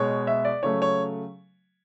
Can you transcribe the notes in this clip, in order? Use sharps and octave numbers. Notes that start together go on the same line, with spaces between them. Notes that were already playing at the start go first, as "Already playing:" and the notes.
Already playing: B2 G#3 C#5
E5
D5
C#3 F#3 A3 C#5
C#5